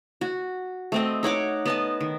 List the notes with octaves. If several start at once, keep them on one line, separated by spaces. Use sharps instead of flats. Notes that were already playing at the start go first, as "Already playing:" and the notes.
F#4
A3 C4 D#5
D#4 C#5 F#5 D6
B3 D#5 A5
D#3